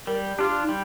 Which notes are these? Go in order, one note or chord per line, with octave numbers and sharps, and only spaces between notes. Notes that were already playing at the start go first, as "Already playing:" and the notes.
G3 A#4
D4 F4 G4
D#4
G3